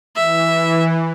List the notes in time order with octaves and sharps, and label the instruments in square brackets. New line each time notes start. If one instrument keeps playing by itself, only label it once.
[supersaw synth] E3 [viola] E5